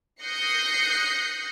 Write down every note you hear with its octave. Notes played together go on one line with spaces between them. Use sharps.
D#6 F#6 G6 A#6 C7 C#7